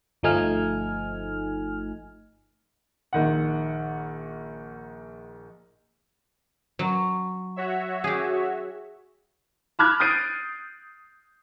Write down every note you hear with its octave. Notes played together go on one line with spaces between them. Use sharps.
G1 F3 A3 D#4 G#5 F6
A#1 D#3 F#5
F#3
F#4 C#5 E5
G4 G#4
A5 B5 D6 F6 F#6 G#6
D#6 G6 A6 C7 D7 D#7